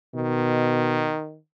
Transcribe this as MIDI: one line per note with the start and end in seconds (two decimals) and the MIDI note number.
0.14 1.13 47
0.14 1.38 51